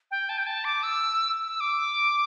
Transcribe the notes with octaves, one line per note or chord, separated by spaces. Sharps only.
G5
A5
G5
A5
D6
E6
E6
D6